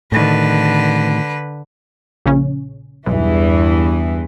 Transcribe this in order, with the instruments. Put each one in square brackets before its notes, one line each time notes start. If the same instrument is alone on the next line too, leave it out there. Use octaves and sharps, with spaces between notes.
[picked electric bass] A2 D#3 [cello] D3 B4
[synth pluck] A#1 C#3 C#4
[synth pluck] B1 [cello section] E2 G2 E3